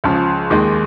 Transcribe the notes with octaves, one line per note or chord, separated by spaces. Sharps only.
C#2 C#3 F3
D#2 D#3 G#3